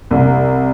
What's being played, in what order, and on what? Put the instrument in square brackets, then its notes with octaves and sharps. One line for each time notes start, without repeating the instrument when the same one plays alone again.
[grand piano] C2